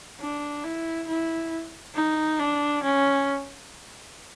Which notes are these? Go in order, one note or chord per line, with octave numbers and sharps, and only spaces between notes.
D4
E4
E4
D#4
D4
C#4